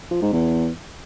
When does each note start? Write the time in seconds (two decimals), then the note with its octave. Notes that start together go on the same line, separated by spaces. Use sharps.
0.11 F3
0.22 G#2
0.32 E2